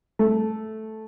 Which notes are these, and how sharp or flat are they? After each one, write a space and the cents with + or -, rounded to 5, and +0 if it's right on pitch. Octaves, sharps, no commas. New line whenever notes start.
A3 -5